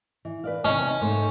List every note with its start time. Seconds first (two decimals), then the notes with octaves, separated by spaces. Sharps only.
0.25 E3
0.44 B4 D5 F5
0.65 C3 C#4 D#4
1.02 G#2 A3 C5